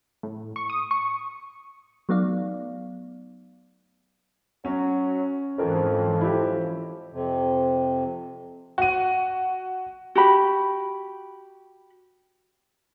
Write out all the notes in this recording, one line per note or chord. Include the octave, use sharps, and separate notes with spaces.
A2
C#6
D#6
C#6
F#3 A3 B3 D#4 D5 F5
F#3 C#4
F2 G#2 E3 F3 A#4
E4 G4
F2 C3
F#4 D#7
F#4 G4 B5